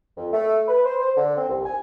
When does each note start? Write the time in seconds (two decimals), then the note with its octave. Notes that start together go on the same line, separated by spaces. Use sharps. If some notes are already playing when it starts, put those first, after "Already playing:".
0.18 F2
0.33 A3
0.68 B4
0.86 C5
1.00 C5
1.17 D3
1.38 C4
1.49 C2
1.66 G#5